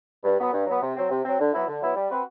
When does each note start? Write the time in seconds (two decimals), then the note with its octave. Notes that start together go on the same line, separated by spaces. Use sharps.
0.24 G2
0.38 F#3 B3
0.53 G2
0.67 F#3 B3
0.81 C3
0.95 F#3 C4
1.10 C3
1.24 F#3 C4
1.39 D3
1.53 F#3 B3 E4
1.68 D3
1.81 F#3 B3 E4
1.95 G3
2.10 C4 F#4 B4